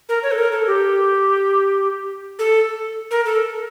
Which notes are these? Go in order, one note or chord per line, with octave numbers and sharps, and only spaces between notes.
A#4
C#5
A4
A#4
A4
G4
A4
A#4
A4